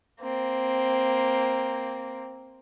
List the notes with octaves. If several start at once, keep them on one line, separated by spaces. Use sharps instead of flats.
A#3 C4